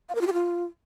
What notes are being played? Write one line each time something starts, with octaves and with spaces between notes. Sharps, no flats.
F5
A#4
F4
G4
F4